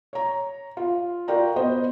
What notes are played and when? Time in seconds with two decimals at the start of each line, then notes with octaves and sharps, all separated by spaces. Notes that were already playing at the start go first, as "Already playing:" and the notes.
0.13 C#5 A#5
0.77 F4
1.28 F4 F#4 A#4 D5 G5 A#5
1.56 B3 C5 D#5